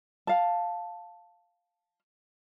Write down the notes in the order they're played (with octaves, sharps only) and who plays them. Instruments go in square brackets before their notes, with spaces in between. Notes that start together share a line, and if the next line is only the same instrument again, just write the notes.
[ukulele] F5 A5